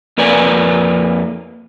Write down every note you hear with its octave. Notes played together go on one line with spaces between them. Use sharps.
F2 A#3 B4 D5 G#5